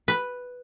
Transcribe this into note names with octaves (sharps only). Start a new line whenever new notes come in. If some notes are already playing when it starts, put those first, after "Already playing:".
B4